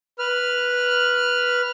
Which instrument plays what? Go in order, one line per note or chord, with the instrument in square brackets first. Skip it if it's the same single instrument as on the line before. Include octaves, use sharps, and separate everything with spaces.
[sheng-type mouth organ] B4 F6